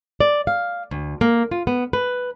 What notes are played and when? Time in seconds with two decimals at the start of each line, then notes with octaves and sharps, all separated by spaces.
0.20 D5
0.47 F5
0.91 D2
1.21 A#3
1.51 F4
1.67 B3
1.93 B4